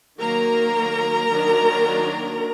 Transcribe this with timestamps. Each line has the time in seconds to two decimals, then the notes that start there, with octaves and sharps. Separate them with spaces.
0.19 D#3 F#3 A#3 A#4 A#5
1.30 D#3 F#3 A#3 D4